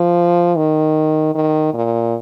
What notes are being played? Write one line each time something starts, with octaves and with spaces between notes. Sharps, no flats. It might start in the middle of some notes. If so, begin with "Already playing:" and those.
Already playing: F3
D#3
D#3
A#2